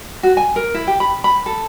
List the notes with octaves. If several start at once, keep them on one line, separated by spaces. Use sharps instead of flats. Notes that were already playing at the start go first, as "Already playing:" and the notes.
F#4
G#5
A#4
E4
G4
B5
B5
A4